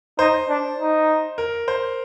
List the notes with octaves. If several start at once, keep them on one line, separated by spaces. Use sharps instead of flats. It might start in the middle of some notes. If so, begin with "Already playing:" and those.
D#4 C5
D4
D#4
A#4
C5